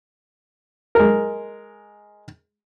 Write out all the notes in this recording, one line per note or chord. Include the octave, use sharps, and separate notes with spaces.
G#3 A#4